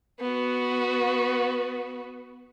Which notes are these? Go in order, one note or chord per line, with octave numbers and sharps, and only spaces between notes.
B3 F#4